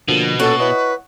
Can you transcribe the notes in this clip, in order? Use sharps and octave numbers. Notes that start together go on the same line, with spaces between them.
B2 D3 F3 A#3
A#2 C#4 F#4 A4
E4 B4 C#5 D#5